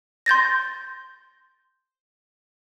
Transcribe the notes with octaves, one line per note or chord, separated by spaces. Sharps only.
C6 G6 A6 A#6